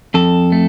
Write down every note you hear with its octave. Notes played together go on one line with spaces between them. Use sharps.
F2 A4
A3